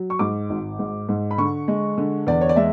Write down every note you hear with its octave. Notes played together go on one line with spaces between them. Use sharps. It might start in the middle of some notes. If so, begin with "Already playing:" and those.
Already playing: F#3
C#6
G#2 D6
G#1
G#2
G#2
B5
D3 C#6
G#3
D3
E2 D5
C#5
D5
G#3 E5